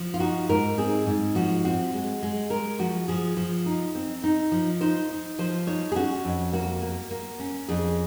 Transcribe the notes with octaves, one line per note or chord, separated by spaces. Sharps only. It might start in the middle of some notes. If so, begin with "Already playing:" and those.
Already playing: F3
F4
D#4 F#4
G#2 A#4
C4 G#4
G#2
F3 F#4
C4 F#4
G#3
G#3
G#3 A#4
F3 F#4
F3 G#4
F3
D#4
C4
D#4
F3
D#4 C5
D#4
F3 C5
D#4 C#5
G#4
C#4 F#4
F2
A#3 F#4
A#3
A#3
C#4
F2 G#4